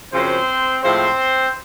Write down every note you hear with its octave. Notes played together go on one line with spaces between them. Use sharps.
F#2 C#3 F3 G#3 C4 C5
A2 F3 G#3 C4 C5